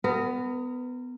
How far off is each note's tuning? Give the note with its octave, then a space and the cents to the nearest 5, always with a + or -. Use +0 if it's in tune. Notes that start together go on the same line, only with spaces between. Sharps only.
B3 +20 A#4 -20